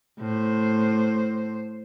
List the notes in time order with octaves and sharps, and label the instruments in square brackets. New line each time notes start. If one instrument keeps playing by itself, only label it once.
[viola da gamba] A2 C5